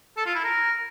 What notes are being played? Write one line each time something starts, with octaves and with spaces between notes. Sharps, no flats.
A4
F4
E4
A#4